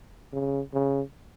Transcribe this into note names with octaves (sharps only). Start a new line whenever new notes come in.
C#3
C#3